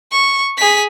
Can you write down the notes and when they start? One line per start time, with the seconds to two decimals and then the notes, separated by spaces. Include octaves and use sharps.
0.12 C#6
0.57 G#4 B6